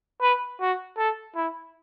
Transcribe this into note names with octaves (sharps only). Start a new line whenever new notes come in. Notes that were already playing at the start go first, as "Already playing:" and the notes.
B4
F#4
A4
E4